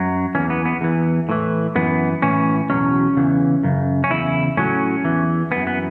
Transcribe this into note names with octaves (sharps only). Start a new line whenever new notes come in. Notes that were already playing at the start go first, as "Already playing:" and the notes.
Already playing: F#2 F#3
E2 E3 C#4
B3
B3
E2 E3
A2 E3
F#2 E3 B3
A2 E3 C#4
E2 B2 F#3 C#4
E2 C#3 E3
F#2 C#3
C#4
E2 C#3 E4
A2 F#3 C#4
E2 E3
F#2 E3 B3
B3